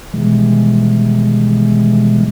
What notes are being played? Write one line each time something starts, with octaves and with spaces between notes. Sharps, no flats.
B2 D#3 E3 G3 G#3